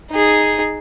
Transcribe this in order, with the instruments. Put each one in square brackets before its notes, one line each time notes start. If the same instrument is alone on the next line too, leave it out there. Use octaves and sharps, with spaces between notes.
[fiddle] D#4 G#4